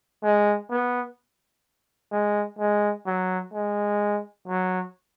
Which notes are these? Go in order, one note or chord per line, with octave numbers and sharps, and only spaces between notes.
G#3
B3
G#3
G#3
F#3
G#3
F#3